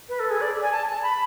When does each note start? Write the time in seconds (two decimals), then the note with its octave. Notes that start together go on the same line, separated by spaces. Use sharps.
0.09 B4
0.19 A4
0.30 G#4
0.41 D5
0.62 G#5
0.72 A5
0.88 A5
1.03 B5